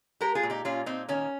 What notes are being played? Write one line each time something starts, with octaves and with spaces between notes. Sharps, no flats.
G#3 G4 A#4
F4 G#4
A#2
D#4 G4
A#2 C#4 F4
A#2 C4 D#4
D#3 C#4